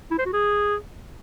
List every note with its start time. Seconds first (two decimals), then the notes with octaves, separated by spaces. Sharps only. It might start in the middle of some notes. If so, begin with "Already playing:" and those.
0.11 E4
0.19 C5
0.26 F#4
0.33 G#4